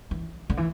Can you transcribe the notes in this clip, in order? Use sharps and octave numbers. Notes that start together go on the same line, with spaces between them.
E3
D3
E3